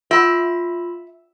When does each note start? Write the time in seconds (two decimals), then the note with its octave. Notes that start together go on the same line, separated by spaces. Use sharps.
0.11 F4 E5 B5